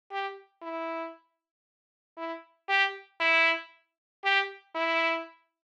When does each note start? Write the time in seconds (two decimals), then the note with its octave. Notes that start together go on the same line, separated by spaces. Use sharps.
0.11 G4
0.62 E4
2.18 E4
2.69 G4
3.20 E4
4.24 G4
4.75 E4